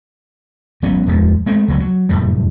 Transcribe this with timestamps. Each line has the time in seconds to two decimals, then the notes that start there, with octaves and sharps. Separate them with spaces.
0.82 G#1 F#3 B3 C#4
1.07 D1 E2 F3 G#3
1.46 G#3 A3 C4
1.68 C#2 F#3 A3 B3
1.80 F#3
2.09 F1 F#2 A2 G3